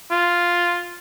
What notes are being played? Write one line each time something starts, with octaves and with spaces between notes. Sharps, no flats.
F4